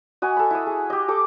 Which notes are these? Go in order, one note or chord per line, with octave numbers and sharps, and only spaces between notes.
F#4 D#5 G#5 B5
A4 B5
E4 D#5
G#4
G4 D#5
G4 A4 D6